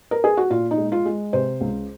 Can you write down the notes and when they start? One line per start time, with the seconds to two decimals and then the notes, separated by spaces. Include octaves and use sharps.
0.11 A#4
0.24 G#4
0.37 F#4
0.50 A#2 F4
0.71 D#4
0.78 G#3
0.92 F4
1.05 G#3
1.33 C3 C5
1.61 C#2